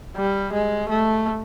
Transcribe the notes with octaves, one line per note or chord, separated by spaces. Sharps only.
G3
G#3
A3